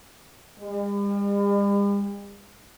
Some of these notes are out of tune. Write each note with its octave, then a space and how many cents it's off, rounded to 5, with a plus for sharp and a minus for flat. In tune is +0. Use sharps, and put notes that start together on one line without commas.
G3 +45